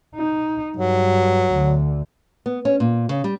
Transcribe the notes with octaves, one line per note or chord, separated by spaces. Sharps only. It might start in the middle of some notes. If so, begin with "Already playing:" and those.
D#4
G2 F#3
D2 D3
B3
C#4
A#2
C#3
G3